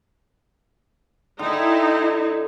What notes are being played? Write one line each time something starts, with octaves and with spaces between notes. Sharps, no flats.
D3 D#4 E4 G5 A5